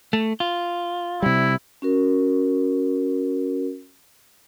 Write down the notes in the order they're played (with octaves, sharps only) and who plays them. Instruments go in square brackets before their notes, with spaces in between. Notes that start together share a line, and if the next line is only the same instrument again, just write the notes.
[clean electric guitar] A3
F4
[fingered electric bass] C3 G3 [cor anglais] E4
[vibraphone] C#4 F#4 A#4